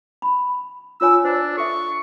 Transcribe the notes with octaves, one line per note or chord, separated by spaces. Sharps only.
B5
F4 C#5 G#5 E6
D4 C5
A4 E5 C#6